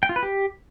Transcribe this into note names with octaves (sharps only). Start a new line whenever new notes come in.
G5
F4
B4
G4